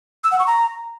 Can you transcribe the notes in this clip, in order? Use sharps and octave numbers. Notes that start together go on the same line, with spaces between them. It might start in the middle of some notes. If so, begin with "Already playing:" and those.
E6
F#5
C#6
A#5